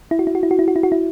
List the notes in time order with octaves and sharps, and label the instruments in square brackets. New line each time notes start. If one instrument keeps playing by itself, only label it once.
[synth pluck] E4
F#4
E4
F#4
E4
F#4
E4
F#4
E4
F#4
E4